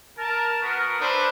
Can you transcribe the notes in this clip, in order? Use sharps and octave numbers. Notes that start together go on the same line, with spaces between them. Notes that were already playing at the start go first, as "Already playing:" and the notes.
A#4 A5
B3 F#4 A#4
D4 A4 B4 C5